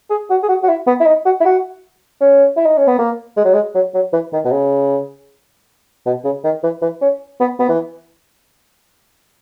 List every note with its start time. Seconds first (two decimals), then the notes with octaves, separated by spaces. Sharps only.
0.10 G#4
0.30 F#4
0.43 G#4
0.49 F#4
0.63 F#4
0.68 E4
0.87 B3
1.00 E4
1.07 D#4
1.25 F#4
1.41 E4
1.45 F#4
2.21 C#4
2.57 E4
2.66 D#4
2.78 C#4
2.87 B3
2.99 A#3
3.37 G#3
3.45 F#3
3.54 G#3
3.75 F#3
3.94 F#3
4.13 E3
4.33 D#3
4.45 B2
4.52 C#3
6.06 B2
6.24 C#3
6.44 D#3
6.63 E3
6.82 E3
7.02 C#4
7.40 B3
7.59 B3
7.69 E3